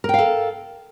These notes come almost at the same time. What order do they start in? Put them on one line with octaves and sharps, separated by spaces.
A#4 G5 F5 A4